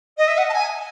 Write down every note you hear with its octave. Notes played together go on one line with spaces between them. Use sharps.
D#5
E5
F#5
A5
G#5